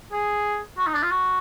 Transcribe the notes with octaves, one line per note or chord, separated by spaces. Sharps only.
G#4
F#4
D#4
D4
F4
F#4